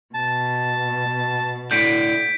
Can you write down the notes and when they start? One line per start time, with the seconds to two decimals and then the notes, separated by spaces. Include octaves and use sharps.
0.15 B2 A5
1.71 A2 D3 G6 B6 D7